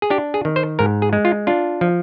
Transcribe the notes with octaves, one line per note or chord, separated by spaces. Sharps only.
G#4
D4 G4
G#4
D#3
C5
G#2 A#4
G#4
G#3
F4
D4 F4
F3